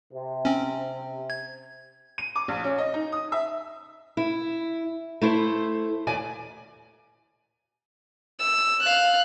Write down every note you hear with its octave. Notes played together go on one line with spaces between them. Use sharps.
C3
C4 C#4
G#6
D#7
D6
A#1
C#4
D#5
D#4
D#6
E5
E4
A3 E4 C5
D#2 D5 G#5
E6
F5 F#6